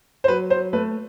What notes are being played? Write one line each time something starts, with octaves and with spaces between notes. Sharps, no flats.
C5
F#3 B4
F#3 C5
A3 B4